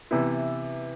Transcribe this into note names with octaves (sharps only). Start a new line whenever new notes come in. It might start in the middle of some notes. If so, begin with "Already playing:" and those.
C3 E3 B3 E4